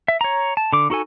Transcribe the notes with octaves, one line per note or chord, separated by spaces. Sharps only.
E5
C#5 A#5
A5
D3 D6
D#4 F#4 A4 G#5